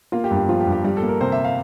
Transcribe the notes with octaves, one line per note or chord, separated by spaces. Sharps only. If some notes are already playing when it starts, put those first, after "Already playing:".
A#3 F4
G4
G2
G4
F3 F4
G4
G2
G4
G3 G4
A4
A#3
A#4
C3 C5
E5
F5